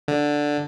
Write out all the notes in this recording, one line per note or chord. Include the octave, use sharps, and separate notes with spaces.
D3